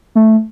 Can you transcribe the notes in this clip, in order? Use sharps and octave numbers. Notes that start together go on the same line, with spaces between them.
A3